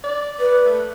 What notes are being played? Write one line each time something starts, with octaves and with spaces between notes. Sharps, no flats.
D5
B4
A3